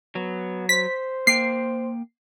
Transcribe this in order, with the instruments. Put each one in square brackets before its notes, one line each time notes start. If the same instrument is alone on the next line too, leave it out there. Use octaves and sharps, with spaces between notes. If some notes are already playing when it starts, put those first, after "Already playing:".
[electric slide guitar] F#3 [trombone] B3
[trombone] C5 [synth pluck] B6
[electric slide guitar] A#3 G5 [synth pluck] C7